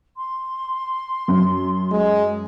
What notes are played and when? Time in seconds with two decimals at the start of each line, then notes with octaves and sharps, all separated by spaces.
0.17 C6
1.28 F#2
1.91 G#3